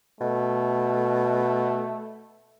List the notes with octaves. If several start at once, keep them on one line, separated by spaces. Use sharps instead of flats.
B2 A3